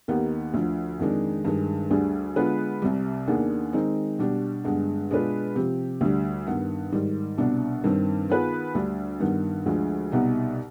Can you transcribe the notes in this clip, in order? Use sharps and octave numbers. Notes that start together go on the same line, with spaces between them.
D#2 D#3 B3 D#4 G4
D2 D3 F3
F2 D#3 G#3 D4
G2 D#3 G#3
D2 D3 G3 D4 G#4
D3 G#3 B3 F4 B4
C2 C3 G3
D#2 D#3 B3 D4 G#4
D#3 G#3 C4 D#4
B2 G3 D4 G4
G2 D3 G#3 B3
B2 G#3 D4 F4 B4
C3 F3 C4 G4
D2 D3 G3
G2 D#3 B3
G#2 D#3 G3
C2 B2 B3 D4
G2 D#3 G3 C4
D#3 B3 F4 G#4 B4
D2 D3 G3 D4
G2 D#3 G3 B3
D2 D3 F3 G#3
C2 B2 B3 D#4 G4